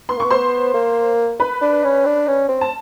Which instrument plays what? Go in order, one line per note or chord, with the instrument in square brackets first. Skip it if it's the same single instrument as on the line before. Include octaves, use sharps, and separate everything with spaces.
[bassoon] B3 [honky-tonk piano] C6
[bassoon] A#3
[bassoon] B3 [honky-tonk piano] C#6
[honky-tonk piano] C5 C6
[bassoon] A#3
[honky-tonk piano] B4 B5
[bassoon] D4
C#4
D4
C#4
C4
[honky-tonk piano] A5